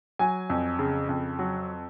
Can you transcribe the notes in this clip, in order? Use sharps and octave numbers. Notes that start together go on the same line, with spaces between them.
F#3 G#5
F2
C#3
F2
F#3